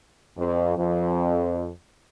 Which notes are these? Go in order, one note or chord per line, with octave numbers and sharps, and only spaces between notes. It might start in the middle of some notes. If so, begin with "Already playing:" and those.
F2
F2